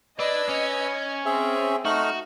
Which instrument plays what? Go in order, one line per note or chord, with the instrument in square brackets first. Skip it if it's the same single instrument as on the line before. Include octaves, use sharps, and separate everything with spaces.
[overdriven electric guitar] D4 [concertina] B4 E6 [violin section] D#5 G#6
[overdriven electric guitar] C#4
[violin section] C4 [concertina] G#4 E5
[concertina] A3 D#4 F6 [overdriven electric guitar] F#4